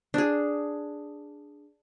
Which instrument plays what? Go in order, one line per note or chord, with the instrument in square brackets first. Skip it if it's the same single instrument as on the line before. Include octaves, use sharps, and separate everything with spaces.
[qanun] D4 G#4